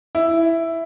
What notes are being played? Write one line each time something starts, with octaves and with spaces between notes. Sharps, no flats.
E4